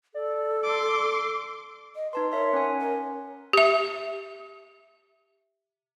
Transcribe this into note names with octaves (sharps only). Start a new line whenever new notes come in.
A4 D5
C6 D6
D#5
D#4 B4 A5 C6
A#4 C#5 E5 C6
C#4 F#5 G#5
A#4
G4 E5